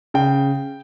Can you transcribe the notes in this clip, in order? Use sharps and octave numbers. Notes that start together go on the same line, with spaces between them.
C#3 G5